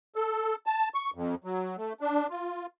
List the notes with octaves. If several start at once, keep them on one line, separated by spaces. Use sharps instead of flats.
A4
A5
C#6
F2
F#3
A3
D4
F4